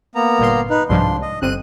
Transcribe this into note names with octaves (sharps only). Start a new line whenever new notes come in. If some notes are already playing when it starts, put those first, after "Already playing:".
A#3 B3 A#5
G1 A#2 C6
D#4 B4
C2 G#2 F3 D4 C6
D#5
G1 C4 F#6 D#7